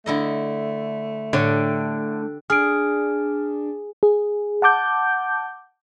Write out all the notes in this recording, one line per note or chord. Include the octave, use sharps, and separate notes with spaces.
D3 A3 E4 D#5
A2 D3 D4 G4 C#5
D4 G#4 F6 D7
G#4
F#5 A5 D6 G6